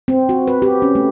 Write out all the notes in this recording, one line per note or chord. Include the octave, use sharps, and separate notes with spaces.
C4
F#4
B4
G4
C#4
A3